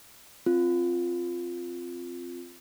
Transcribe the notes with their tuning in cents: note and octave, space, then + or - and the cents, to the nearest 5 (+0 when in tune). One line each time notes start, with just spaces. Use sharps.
C4 +0 F4 +0